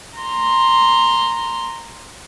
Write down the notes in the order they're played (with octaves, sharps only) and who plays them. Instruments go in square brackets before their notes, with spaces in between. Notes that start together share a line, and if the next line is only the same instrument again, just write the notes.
[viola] A#5 C6